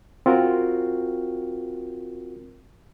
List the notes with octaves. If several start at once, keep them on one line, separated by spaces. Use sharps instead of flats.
C4 F4 F#4 A#4